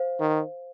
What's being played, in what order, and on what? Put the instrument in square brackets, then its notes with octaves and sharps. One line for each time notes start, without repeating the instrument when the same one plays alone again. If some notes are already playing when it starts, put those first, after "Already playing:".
Already playing: [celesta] C5 F5
[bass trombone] D#3